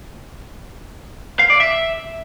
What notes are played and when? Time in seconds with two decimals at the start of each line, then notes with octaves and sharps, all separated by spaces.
1.39 F5
1.50 D5
1.60 E5